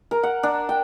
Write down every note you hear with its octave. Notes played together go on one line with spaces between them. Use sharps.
A#4
F#5
D4
G5